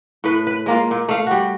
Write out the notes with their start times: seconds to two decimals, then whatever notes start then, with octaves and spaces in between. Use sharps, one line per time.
0.24 A2 B4
0.47 B4
0.66 G#3 A#3 F4
0.91 A#2
1.09 A3 F5
1.27 G3 F#4